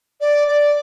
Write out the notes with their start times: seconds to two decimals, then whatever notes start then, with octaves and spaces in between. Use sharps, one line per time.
0.21 D5
0.48 D5